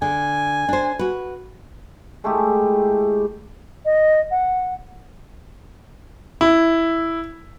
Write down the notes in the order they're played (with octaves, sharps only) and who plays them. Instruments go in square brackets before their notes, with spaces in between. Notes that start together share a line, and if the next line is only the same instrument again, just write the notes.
[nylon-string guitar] D3 [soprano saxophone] G#5
[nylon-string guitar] D4 C5
F#4 B4
[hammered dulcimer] G#3 A3 E4 G4
[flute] D#5
F#5
[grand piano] E4